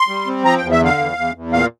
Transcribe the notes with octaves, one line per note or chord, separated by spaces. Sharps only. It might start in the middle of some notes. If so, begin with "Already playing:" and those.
Already playing: C6
G3
C4
F3 A#5
E2 G5
E5
D3 F5
E2
E2
E2
A#2 F5